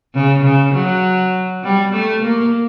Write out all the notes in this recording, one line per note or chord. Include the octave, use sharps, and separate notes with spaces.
C#3
C#3
F#3
G3
A3
A#3